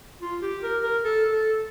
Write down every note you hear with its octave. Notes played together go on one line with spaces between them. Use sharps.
F4
G4
A#4
A#4
A4
A4